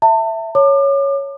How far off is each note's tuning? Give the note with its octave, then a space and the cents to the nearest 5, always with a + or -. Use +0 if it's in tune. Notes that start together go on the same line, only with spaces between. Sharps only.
E5 +0 A5 +35
C#5 +0 D6 +35